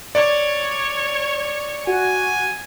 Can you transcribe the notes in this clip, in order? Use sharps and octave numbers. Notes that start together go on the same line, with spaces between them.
C#5 D5 C#7
F#4 G#5